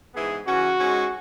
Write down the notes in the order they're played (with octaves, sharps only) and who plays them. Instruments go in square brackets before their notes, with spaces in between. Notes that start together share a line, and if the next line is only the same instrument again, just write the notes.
[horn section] G#2 E3 B3 G#4
C#3 E3 C#4 F#4
G#2 G#3 C#4